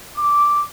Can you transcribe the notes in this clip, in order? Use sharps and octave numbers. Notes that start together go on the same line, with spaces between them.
D6